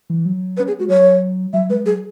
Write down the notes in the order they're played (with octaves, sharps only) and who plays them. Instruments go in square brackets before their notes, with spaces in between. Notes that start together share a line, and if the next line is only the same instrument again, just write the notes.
[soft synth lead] E3
F#3
[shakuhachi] B4
[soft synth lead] C#4
[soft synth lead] B3 [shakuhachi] G#4
[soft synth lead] G#3 [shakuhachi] F#4
[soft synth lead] F#3 [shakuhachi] C#5
[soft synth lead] F#3 [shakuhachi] E5
[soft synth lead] G#3 [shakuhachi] B4
[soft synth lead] F#3 [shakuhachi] G#4